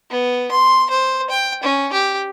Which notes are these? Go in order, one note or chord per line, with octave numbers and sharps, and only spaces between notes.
B3
C6
C5
G5
C#4
G4